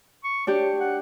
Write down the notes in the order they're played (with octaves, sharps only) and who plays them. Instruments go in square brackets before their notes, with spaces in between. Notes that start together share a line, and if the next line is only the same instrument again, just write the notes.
[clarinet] C#6
[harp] D4 G4 [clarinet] C#5
[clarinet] F#5